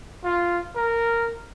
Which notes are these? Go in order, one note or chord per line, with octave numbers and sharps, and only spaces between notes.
F4
A#4